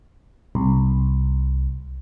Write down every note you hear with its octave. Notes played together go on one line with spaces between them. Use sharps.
C2